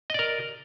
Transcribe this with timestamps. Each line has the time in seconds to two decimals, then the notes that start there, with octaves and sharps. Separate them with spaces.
0.10 D#5
0.14 D5
0.19 A#4